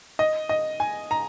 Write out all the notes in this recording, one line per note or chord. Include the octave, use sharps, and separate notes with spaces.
D#5
D#5
G#5
A#5